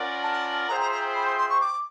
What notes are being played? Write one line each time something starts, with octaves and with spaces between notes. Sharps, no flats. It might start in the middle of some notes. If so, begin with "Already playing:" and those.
Already playing: C#4 F4 A#4 D5 F#5
A5
F4 G#4 C5 E5 G5 A#5
A#5
A#5
B5
C6
C6
C#6
D6